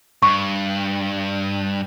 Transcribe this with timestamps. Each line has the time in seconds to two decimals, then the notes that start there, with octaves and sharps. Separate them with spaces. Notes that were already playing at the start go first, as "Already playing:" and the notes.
0.23 G2 C#6